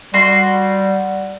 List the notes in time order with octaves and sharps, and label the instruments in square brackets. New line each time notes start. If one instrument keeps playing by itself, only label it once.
[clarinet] G3 [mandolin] F#4 C6